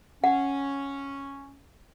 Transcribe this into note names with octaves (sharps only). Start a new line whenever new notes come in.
C#4 F#5